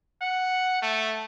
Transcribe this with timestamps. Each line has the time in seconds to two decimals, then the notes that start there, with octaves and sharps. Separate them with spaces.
0.22 F#5
0.82 A3